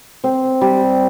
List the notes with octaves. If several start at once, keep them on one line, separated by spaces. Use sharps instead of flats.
C4
G3